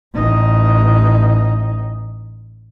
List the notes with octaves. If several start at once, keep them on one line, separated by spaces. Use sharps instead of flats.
A1 D#4